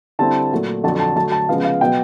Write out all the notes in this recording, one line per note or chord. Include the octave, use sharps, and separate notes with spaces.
D3 G3 C4 E4 A5
A#2 F#3 A3
F2 D3 F#3 A5
A5
D3 F#3 A3 A5
A5
C#3 F3 G#3 B3 F5
F5
B2 F#3 B3 G5